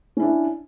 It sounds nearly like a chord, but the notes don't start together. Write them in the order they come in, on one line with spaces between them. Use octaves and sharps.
C#4 E4 D4